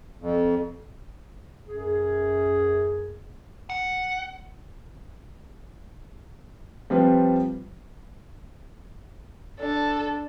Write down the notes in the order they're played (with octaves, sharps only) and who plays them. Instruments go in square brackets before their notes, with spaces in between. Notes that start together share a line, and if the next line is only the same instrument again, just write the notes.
[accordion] F2
[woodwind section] F#2 G#4
[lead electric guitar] F#5
[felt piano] F3 G3 C4 F4 B4
[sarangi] D4 [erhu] A4